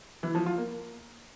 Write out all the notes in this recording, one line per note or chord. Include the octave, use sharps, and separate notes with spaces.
E3
F3
F4
A#3